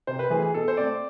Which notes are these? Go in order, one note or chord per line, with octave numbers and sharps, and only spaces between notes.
C3 C5
B4
E3 A3 G#4
G#4
B2 A4
C5
A3 C4 D5